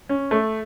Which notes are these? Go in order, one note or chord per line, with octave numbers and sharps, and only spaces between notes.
C#4
A3